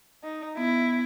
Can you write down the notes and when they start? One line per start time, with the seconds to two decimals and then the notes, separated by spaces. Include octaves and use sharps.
0.24 D#4
0.57 B3 E4